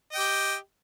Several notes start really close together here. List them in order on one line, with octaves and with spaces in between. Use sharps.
D#5 G5 G4